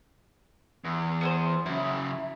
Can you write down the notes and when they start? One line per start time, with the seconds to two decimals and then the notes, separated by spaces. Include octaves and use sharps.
0.85 E2
1.21 B3 G#4 C5
1.66 F#2 C#3 E4